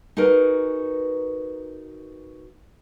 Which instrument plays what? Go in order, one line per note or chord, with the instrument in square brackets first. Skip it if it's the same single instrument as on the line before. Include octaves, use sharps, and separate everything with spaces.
[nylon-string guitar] D#4 F#4 G#4 A#4 B4